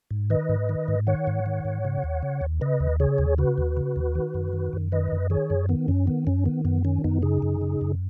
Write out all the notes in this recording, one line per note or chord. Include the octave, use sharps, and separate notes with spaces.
G#2
D#3 B4 D#5
G#2
D#3
G#2
D#3 C#5 F#5
G#2
D#3
G#2
C#3
D#2
C#3
D#2
C#3 B4 D#5
D#2
C#3 G#4 C#5
D#2
C#3 F#4 B4
D#2
C#3
D#2
D#3
F#2
D#3
F#2
D#3 B4 D#5
F#2
D#3 G#4 C#5
F#2
D#3 B3
F#2 C#4
D#3 B3
F#2 C#4
D#3 B3
F#2 B3
D#3 C#4
F#2 B3 D#4
C#3 D#4 G#4
F#2
C#3
F#2